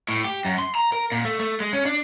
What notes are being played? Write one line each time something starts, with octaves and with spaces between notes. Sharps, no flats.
A2
G4
F#2
C6
A#5
A#4
A#2
A3
A3
G#3
C#4
D4